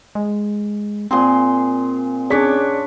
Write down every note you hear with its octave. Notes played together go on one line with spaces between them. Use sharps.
G#3
A#2 C4 G#4 C6
C#4 D4 G#4 C#5 D6 B6